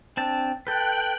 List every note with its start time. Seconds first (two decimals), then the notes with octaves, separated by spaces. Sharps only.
0.17 C4 D4 A5
0.67 A4 B4 G5 F#6